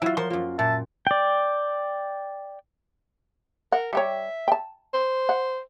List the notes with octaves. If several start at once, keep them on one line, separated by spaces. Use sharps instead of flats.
F#3 E4 F4 E5
F3 A#4 C6
F#2 A#3 F4
A#2 E5 A5
D5 G5
A#4 F#5
G3 G4 C#5 E5
G5 A5
C5
F#5